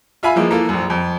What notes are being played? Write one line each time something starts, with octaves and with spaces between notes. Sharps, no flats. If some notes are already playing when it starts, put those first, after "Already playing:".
F4 E5 F5 G#5 B5
E3 F3 G#3 A#3
E3 A#3 F4 A4
A#1 F#2
F2